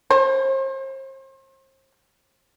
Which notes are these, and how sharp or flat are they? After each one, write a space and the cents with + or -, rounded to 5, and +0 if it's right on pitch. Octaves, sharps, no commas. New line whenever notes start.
C5 +40